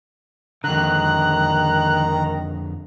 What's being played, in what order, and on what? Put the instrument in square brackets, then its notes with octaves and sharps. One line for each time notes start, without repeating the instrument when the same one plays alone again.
[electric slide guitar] F2 D3 [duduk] D#3 [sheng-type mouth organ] A#5 [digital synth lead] F#6